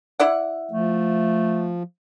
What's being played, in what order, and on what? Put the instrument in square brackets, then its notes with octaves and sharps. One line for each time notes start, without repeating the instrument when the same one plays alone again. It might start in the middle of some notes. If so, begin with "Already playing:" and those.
[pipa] E4 D5 F#5
[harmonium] F3 [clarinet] A3